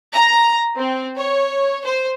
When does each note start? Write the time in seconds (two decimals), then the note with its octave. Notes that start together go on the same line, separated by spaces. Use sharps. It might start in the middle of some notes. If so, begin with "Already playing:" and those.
0.15 A#5
0.77 C4
1.17 C#5
1.85 C5